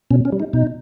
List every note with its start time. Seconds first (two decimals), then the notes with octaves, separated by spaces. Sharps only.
0.11 B2 C#4
0.25 C#4
0.32 G3
0.40 D#4
0.53 B2 D#4